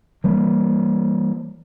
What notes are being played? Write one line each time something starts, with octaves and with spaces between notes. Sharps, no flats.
E3 G3 A#3